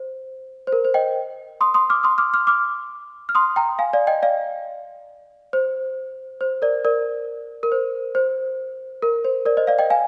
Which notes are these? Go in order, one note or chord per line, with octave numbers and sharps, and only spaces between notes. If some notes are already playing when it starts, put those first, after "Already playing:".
Already playing: C5
C5
A#4
C5
D#5 G5
C6 D#6
C6 D#6
D6 F6
C6 D#6
D6 F6
D6 F6
D6 F6
F6
C6 D#6
G5 A#5
F5 G#5
D5 F5
D#5 G5
D5 F5
C5
C5
A#4 D5
A#4 D5
A#4
C5
C5
A#4
C5
A#4 D5
C5 D#5
D5 F5
D#5 G5
F5 G#5